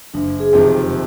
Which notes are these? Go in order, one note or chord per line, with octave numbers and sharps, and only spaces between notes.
F#1 D4
G#4
F2 C3 D#3
G4